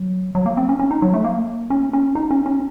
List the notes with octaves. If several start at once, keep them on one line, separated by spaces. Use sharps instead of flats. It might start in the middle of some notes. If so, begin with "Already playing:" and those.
Already playing: F#3
F#3
A#3
C4
C#4
C#4
D#4
F#3
A3
A#3
C#4
C#4
D#4
C#4
C#4